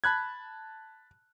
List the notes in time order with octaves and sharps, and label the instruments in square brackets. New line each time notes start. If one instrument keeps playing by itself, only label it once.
[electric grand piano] A5 B5 F#6 G#6